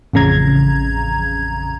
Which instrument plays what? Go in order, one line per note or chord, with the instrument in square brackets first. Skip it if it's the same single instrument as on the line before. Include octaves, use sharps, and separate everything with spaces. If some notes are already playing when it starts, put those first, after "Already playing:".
[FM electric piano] A1 F2 C#3 A#5 G#6